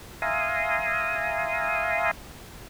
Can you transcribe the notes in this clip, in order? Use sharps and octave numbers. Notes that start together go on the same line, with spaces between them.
E5 F5 G#5 A#5 C6 D#6